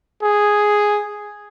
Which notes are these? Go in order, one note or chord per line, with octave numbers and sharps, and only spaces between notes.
G#4